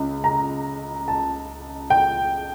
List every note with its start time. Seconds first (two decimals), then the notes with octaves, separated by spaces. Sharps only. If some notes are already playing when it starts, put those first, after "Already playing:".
Already playing: C#2
0.24 A#5
1.08 A5
1.90 G5